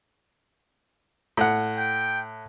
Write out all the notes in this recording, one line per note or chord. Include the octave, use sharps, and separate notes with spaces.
A2 F#5
G5